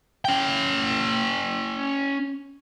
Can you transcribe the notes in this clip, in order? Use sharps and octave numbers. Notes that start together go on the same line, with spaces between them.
C#4 G5